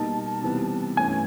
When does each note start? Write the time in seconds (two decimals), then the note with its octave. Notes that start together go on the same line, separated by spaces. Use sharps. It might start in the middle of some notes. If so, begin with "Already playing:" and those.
Already playing: B2 G3 A#3 D#4 A5
0.42 C3 E3 G3 B3
0.97 G2 E3 A3 C#4 G#5